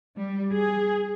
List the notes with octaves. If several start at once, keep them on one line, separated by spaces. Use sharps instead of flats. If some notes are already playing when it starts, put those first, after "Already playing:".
G3
G#4